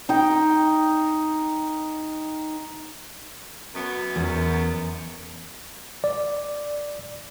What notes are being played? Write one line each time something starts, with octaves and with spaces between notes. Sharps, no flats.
D#4 G5
F#2 B3
E2
D5